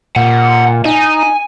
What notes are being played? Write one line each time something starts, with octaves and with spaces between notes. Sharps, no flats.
A#2 F#5
D#4 G#5